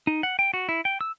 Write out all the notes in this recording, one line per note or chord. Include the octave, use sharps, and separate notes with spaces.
D#4
F#5
G5
F#4
E4
G5
E6